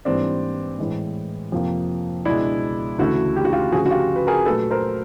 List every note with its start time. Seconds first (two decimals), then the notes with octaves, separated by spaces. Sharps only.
0.05 G#2 E3 G3 A#3 C4 D4
0.79 A2 E3 G#3
1.52 F2 C3 F3 A#3
2.25 C#2 B2 G#3 D4 E4
2.99 D2 C#3 E3 A3 E4 F#4
3.36 G4
3.45 F#4
3.52 F4 G4
3.72 D2 C#3 F3 F#4 G#4
3.86 F#4
3.90 F4 G4
4.16 B4
4.27 G#4 A#4
4.46 A#2 F#3 A3 A4 B4
4.70 A#4 C5